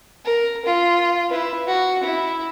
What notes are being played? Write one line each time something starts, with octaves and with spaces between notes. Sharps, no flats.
A#4
F4
E4 B4
F#4
E4